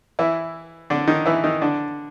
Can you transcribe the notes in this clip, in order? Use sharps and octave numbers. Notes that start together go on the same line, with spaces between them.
E3 E4
D3 D4
D#3 D#4
E3 E4
D#3 D#4
D3 D4